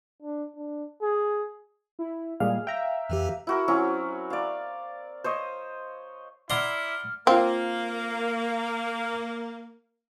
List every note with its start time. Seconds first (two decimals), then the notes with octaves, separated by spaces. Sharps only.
0.22 D4
0.57 D4
1.02 G#4
1.99 E4
2.40 A#2 G3 G#3 G#4 F5
2.67 E5 G5 A#5
3.10 F2 E3 G4
3.47 E4 F#4 A#4
3.68 F#3 C4 C#4 E4
4.30 D5 F5
5.24 C5 C#5 D#5
6.50 E4 D5 F#5 A#5 C6 D6 F6
7.27 A#3 C4 F4 F5